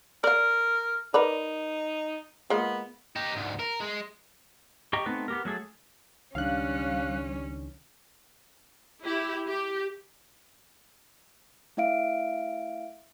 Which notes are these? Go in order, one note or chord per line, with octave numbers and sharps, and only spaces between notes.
A#4 D5 F5
D#4 A#4 B4 D5
G#3 A#3 B3 F4
D#4 G4
D2 G#2
A#4
G#3
G4 D#5 G5 A#5 C#6
A3 B3 C4 D#4 B4
B3 G4 A#4
F#3 A3 G#4 A4
C#2 D#3 G3 C#4 D4 F5 F#6
E4 G4
G4
A3 E4 E5 F5 D7